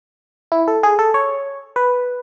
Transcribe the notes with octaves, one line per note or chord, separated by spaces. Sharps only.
E4
A4
G#4
A4
C#5
B4